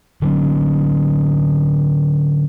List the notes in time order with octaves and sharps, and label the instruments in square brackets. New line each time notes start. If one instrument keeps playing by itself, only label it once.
[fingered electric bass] D3 F#3 B3 C#4